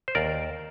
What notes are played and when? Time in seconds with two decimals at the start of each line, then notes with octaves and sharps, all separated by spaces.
0.08 C5
0.15 D#2 A#4 D5